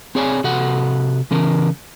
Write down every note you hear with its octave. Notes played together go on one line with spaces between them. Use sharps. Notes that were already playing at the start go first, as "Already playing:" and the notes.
C4 G#4 C#5 D5 G#5
C3 F#4 A4 F#5
C#3 E3 C#4 A#4